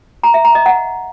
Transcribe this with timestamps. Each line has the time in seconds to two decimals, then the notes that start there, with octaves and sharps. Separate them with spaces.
0.23 A#5
0.34 E5
0.45 A#5
0.55 D#5
0.66 F#5